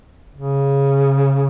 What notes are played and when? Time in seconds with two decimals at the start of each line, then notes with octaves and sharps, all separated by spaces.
0.35 C#3